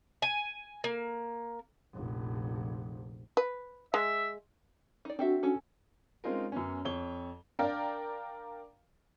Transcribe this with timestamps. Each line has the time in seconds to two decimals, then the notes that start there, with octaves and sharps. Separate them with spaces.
0.22 G#5
0.84 A#3
1.94 F1 A#1
3.37 B4
3.94 G#3 E5
5.05 D#4 D5
5.19 C4 D4 F#4 A4 E5
5.43 C#4 A4
6.24 G#3 C4 C#4 D#4 F4 A#4
6.52 F#2 B3 C#4
6.85 F2 C#5 G7
7.59 D4 A#4 D5 F5 G5